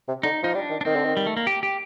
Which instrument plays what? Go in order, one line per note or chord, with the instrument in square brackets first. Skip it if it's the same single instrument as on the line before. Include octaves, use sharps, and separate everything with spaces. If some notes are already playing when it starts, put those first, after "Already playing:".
[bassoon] C3
[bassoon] D3 [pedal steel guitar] D#4
[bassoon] F3 [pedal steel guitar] D#4
[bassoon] G3 [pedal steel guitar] D4
[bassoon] D#3
[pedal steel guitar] D4
[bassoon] D#3 [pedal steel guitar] C4
[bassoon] D3
D#3
[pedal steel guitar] G3
A3
A#3
G4
G4